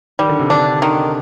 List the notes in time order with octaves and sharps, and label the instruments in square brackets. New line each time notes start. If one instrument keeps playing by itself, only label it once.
[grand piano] D#3 [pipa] G3
[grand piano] D3
C3
[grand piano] D3 [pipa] D4
[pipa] D#3